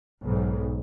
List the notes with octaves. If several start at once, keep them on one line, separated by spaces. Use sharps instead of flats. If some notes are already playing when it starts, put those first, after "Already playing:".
B1 G#2